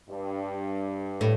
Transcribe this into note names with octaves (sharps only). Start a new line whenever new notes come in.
G2
A2